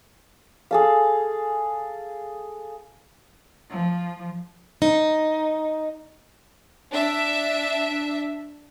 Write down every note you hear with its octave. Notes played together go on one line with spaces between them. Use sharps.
G#4 A4 F5
F3
D#4
D4 E5